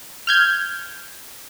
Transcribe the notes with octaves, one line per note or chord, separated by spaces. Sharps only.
F6 G6 G#6